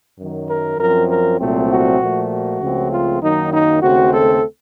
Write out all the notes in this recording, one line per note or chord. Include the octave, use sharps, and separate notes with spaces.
F#2 D#3 F#3
A#4
F#2 F3 C4 A#4
A#4
C2 A#2 F#3 A3 C4
F#4
A#2 F3 A3
F#4
C#2 C#3 F3 A3 C4
F4
F#2 D#3 F#3 A#3 D#4
D#4
D#2 C#3 A3 C4 F#4
A4